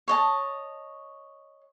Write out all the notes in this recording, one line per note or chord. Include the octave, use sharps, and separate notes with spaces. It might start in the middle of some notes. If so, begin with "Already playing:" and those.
C#5 D#5 A5